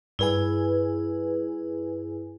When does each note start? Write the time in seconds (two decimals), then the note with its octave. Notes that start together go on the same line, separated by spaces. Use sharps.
0.19 G2 E4 G#4 B4 G#5